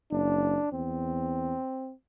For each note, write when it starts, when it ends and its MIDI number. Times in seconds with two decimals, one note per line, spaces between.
0.11 0.57 30
0.11 0.70 62
0.72 1.54 40
0.72 1.93 60